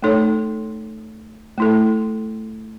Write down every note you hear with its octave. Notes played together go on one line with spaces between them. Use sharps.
A3 D#4 A4 C#5
A3 E4 A4